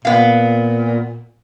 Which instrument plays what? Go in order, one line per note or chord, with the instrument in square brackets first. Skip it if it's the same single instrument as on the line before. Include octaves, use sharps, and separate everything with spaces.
[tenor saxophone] A#2 [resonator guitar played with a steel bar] B3 F5